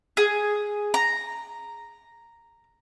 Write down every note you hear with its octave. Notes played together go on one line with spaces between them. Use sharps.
G#4
A#5